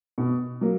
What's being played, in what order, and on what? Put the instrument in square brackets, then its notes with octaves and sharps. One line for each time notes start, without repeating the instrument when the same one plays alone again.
[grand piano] B2
F#3 A#3